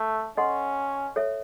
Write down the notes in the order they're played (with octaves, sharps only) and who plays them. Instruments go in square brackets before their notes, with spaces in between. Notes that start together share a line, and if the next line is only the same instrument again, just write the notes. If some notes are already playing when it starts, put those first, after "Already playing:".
Already playing: [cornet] A3
[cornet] C#4 [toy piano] A4 D#5 F#5 C6
[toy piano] A4 C#5 E5